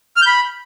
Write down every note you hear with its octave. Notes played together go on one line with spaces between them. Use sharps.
F6
G6
B5